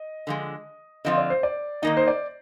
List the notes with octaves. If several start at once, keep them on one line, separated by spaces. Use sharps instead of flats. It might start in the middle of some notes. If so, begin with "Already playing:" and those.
Already playing: D#5
D3 F3 G#3
D3 F3 C4 F4 D#5
D5
C5
D5
D#3 A#3 D#4 D#5
C5
D5